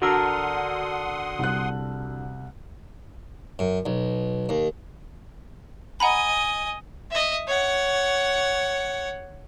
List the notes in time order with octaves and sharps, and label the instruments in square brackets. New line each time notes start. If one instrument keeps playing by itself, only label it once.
[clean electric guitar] D3 D4 A#4 [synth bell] F#4 E6 [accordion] F#5 C6 D#6
[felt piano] C2 F#6
[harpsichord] F#2
B1
D#2
[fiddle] D#5 G#5 [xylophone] F#5 A#5 B5
[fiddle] D#5 E5
C#5 F#5